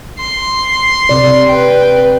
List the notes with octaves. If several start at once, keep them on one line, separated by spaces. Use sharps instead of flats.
C6
C3 D5
B4 G5